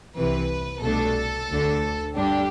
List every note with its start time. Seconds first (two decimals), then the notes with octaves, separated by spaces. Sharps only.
0.16 C2 C3 E3 B4
0.82 C2 B2 A3 D4 A4
1.49 D2 D3 A3 D4
2.16 G2 D3 G3 D4 G4